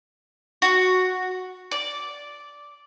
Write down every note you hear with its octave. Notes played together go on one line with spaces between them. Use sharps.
F#4
D5